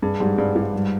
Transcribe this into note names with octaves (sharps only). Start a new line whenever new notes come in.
G2 G#4
G#2 G3
G2 G#4
G2 F4
G3